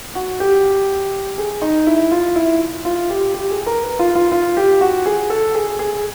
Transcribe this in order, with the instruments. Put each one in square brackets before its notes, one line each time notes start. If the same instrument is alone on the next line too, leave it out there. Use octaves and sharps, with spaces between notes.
[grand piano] F#4
G4
G#4
D#4
E4
F4
E4
F4
G4
G4
G#4
A#4
B4
F4
F4
F4
G4
F#4
G#4
A4
G#4
G#4